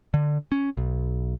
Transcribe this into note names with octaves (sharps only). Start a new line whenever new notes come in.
D3
C#4
B1